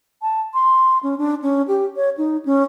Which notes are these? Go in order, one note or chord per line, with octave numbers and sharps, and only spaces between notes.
A5
C6
C#4
D4
C#4
G4
C#5
D#4
C#4